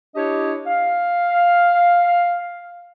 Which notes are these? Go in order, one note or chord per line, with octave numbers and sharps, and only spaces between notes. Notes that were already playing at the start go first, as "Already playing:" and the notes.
D4 E4 G4 C#5 D#5
F5